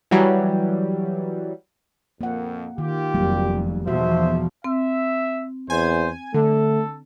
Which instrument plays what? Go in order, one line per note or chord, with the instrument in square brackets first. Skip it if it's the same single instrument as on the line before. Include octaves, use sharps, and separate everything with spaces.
[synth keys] E3 F#3 G3
[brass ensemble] F2 [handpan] A#3 F#5
[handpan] D#3 [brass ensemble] F4 G4
[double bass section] F1 F2 [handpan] F#3 G3 A#3
[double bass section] E2 B2 F3 [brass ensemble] D#4 C5 E5 [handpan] F#4
[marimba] C4 [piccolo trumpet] E5
[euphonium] E2 [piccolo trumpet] C5 [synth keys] G#5
[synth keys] D3 [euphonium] A3 [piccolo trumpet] A4